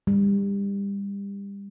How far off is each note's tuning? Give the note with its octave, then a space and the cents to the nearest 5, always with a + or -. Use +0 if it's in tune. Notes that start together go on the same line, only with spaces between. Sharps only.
G3 +30